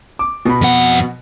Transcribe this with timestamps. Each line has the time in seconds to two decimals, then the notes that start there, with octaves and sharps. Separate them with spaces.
0.19 D6
0.45 B2 B5
0.61 F2 F#5